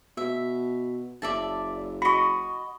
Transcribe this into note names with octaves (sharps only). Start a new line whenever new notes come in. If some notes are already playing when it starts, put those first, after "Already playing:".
B2 E5
F#1 D5 E5 A5
F#4 D#5 B5 C#6